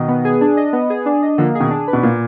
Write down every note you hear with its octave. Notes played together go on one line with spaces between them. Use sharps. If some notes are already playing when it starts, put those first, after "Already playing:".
Already playing: B2 D#3 D#5
B3
G#4
D4
D#5
B3
G#4
D4
D#5
D3 F3 A#3
G#4
B2 D#3
D4
B4
B2
A#2 A#3